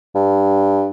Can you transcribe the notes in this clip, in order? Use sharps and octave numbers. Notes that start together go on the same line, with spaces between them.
G2